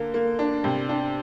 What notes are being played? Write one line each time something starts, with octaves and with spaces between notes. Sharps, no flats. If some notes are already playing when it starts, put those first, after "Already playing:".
Already playing: D3 A#3
A#3
D4
C3
D4